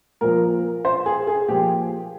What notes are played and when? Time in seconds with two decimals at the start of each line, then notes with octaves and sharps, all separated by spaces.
0.21 A#2 F3 A#4
0.85 C5
1.06 G#4
1.27 G#4
1.48 A#2 F3 G4